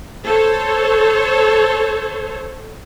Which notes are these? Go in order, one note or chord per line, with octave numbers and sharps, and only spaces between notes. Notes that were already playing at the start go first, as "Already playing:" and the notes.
A4 C5 C#5